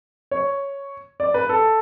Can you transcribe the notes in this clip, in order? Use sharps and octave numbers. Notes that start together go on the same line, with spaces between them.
C#5
D5
B4
A4